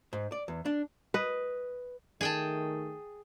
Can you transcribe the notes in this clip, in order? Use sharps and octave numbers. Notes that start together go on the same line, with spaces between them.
G#2
D5
E2
D4
B4 D#5
D#3 A3 G#4 G5 A5